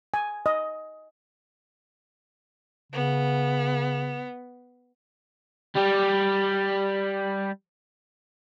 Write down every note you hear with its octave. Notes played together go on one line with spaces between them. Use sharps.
G#5
D#5
C#3 B3
G3 G4